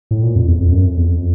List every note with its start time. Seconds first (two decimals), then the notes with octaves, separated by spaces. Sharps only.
0.11 A2
0.23 A#2
0.36 F2
0.48 E2
0.61 F2
0.72 F#2
0.85 F2
0.97 E2
1.09 F2